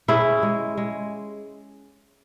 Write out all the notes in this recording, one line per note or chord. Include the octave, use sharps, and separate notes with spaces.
C#4 E4 G#4
G#3
G#3